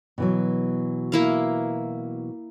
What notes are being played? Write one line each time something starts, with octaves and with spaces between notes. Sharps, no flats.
B2 E3 F#3
A#3 E4 F5